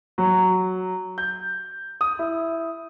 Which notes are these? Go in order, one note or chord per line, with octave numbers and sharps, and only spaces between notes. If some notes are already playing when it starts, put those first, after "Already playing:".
F#3
G6
D#6
E4